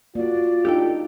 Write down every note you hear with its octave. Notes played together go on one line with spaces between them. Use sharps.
A#3 F4 F#4 D5
D4 D#4 G4 A4 G5